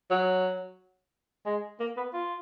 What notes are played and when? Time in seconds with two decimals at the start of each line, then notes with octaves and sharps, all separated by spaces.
0.10 F#3
1.46 G#3
1.80 A#3
1.97 B3
2.14 F4